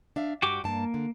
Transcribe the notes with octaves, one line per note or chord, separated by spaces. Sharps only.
D4 E5 F5
G2 F#4 G4 D6
G2 A#3 A5
D3